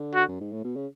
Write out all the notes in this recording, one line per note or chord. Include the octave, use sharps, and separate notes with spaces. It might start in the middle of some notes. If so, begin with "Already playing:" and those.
Already playing: D3
F#4
F#2
G#2
A2
B2
C#3